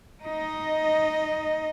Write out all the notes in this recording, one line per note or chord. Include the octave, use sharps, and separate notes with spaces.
D#4 D#5